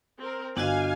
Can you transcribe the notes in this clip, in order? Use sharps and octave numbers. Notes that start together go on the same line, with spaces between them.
C4 A#4
G1 D4 F#4 D#5 F5 G#5